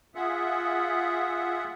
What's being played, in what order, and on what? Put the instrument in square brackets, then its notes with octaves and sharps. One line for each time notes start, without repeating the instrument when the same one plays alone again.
[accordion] F4 G#4 E5 F#5